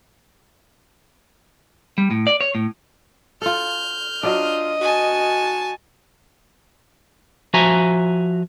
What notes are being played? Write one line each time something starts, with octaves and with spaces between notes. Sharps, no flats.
G3
A2
D5
C#5
A2
F4 A4 F6 G6
F#3 D4 F4 D#5
F#4 G#5 A5
F3 F#4 E5 G#5 A#5